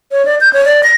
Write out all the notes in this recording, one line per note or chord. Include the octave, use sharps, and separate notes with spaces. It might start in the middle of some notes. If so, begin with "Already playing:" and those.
C#5
D5
G6
C#5
D5
A#6